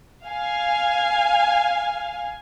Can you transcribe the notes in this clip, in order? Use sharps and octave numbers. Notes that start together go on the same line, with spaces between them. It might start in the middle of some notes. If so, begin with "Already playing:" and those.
F5 G#5